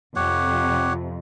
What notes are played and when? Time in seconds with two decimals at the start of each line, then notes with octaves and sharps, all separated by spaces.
0.16 F2 C3 G4 C#5 F#5